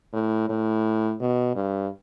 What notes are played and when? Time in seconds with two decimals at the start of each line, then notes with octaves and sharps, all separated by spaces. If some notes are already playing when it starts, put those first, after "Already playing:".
0.13 A2
0.49 A2
1.21 B2
1.55 G2